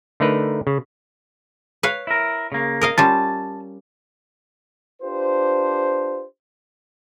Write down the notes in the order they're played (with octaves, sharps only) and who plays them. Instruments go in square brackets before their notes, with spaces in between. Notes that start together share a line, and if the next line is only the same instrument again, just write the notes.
[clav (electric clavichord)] D3 A3 D#4 A#4 B4
C#3
[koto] B4 C#5 F5
[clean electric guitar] E4 A#4
C#3 A#3
[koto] A#4 D#5 F5
[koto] G3 C#4 F4 [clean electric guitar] A5
[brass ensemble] D4 F4 G4 B4 C5